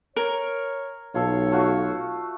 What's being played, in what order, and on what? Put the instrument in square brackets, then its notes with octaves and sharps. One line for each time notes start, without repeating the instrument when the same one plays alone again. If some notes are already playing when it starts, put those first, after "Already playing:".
[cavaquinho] A#4 [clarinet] C#5
[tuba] B1 [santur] F4 A4 [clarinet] C#5
[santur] A3 F4 F#4